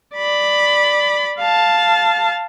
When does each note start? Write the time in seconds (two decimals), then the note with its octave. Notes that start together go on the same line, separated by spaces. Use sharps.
0.15 D5 B5
1.39 F5 A5